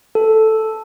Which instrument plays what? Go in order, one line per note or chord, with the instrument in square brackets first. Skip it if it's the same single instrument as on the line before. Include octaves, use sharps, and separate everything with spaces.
[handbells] A4